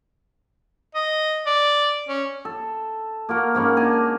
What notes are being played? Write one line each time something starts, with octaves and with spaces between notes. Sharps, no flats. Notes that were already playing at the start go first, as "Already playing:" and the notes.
D#5
D5
C#4
A4
A#3 F#4 A#4
G#2 A#3 C#4 B5
D4 G#5 A#5